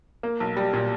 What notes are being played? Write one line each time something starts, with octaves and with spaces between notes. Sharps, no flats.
A#3
B1
G3
A#2